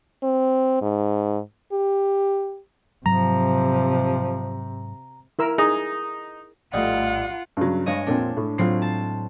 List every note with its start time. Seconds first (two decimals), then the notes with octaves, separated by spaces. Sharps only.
0.23 C4
0.82 G#2
1.72 G4
3.06 G#2 C3 F3 F#3 A#5
5.39 E4 A#4 E6
5.58 D#4 G#4
6.74 A#1 A2 G3 A3 D#4 F4 G4 F#5
7.57 G2 C#3 F#3
7.86 G2 G#3 C#5 D#5 F5
8.07 F2 A#2 C4 D4
8.37 A2
8.58 A2 F#3 C4 F4 C7
8.82 A5